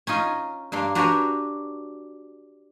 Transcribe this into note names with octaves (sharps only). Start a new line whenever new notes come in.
C#4 D#4 F4 D#5
G2 A#3 D4 F5 C6
D4 F#4 G4 A#4 B4 C#5